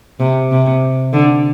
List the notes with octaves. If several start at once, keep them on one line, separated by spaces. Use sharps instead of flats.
C3
C3
D3